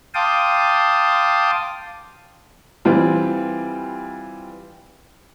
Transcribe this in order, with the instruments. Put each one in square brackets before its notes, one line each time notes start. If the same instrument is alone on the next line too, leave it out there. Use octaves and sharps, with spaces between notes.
[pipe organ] F5 G5 A5 C6 D6 D#6
[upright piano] E3 G3 C4 F4